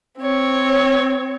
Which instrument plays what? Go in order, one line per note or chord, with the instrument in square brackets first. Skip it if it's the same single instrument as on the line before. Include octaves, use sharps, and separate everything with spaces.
[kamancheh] C4 C#5